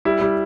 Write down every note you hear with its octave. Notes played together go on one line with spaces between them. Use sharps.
G3 E4
G3 E4